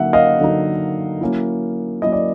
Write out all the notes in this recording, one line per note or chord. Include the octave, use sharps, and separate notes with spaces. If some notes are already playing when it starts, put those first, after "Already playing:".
Already playing: D3 F#3 A#3 D#4 E5 F#5
D#5 F5
D3 F#3 A#3 D#4
F#3 A#3 C#4 E4
F#3 A#3 C#4 E4 D#5
D5